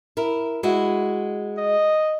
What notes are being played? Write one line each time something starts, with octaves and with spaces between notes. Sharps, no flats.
E4 A#4
G#3 E4 F#4
D#5